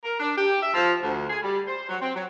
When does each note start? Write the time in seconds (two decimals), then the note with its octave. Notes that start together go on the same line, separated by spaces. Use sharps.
0.04 A#4
0.20 D4
0.36 G4
0.63 E5
0.74 F3
1.02 D2
1.30 G#4
1.42 G3
1.68 C5
1.89 F#3
2.01 C4
2.15 F#3